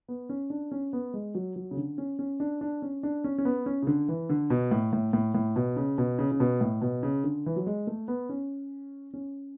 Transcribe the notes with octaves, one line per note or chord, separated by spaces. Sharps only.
B3
C#4
D4
C#4
B3
G#3
F#3
F#3
C#3
D3
C#4
C#4
D4
D4
C#4
D4
C#4
C#4
B3
C#4
C#3
D3
E3
D3
B2
A2
A2
A2
A2
B2
C#3
B2
C#3
C#3
B2
A2
B2
C#3
D3
E3
F#3
G#3
A3
B3
C#4
C#4